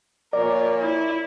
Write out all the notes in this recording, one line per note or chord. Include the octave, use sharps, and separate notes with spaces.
A#2 F3 A#4 C#5 D5
E4